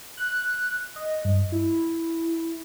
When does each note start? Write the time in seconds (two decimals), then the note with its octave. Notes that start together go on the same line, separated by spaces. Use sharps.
0.17 F#6
0.96 D#5
1.25 G2
1.52 E4